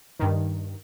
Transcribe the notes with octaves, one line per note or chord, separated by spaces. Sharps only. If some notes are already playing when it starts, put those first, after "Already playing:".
G2 D#3